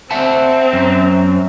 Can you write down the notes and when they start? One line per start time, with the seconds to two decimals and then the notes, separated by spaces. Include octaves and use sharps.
0.11 C4 E5 F#5 A5
0.73 F#2